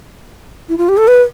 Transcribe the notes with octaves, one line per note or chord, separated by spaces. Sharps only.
E4
F4
G4
A4
B4